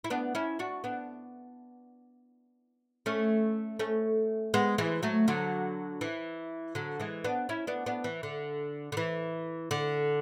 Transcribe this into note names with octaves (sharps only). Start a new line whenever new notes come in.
E4
B3 D4
C#4 E4
D4 F#4
B3 D4
A3 C#4
A3 C#4
G#3 B3
E3 G#3
F#3 A3
D3 F#3
E3
D3 F#3
E3 G#3
B3 D4
C#4 E4
B3 D4
B3 D4
E3
D3
D3
E3
D3